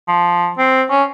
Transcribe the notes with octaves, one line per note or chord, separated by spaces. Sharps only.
F3
C4
C#4